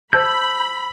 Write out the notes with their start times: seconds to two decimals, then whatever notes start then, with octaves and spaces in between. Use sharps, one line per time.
0.13 C5 A5 B5 E6 G6